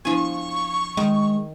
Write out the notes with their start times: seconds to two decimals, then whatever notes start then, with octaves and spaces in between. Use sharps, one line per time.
0.05 F3 B3 D4 E4 G#5 C#6
0.97 D#3 G#3